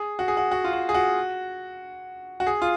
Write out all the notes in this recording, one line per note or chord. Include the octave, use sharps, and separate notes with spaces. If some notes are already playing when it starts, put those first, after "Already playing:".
Already playing: G#4
F#4
G#4
F#4
F#4
F4
F#4
G#4
F#4
F#4
G#4
F4